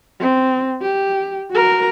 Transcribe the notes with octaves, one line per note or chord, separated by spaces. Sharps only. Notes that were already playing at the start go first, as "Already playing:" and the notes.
C4
G4
F#4 A#4